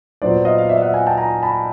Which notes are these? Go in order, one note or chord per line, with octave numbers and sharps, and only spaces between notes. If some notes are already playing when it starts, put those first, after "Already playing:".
A#2 F#3 B3 D4 C5 D5
D#5 F5
F5
D5 E5
F5
E5 F#5
F#5 G#5
G5 A5
G#5 A#5
A5 B5